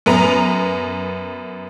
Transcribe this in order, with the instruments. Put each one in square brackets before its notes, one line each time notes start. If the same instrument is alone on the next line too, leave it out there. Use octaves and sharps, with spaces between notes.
[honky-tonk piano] F#2 B3 A#5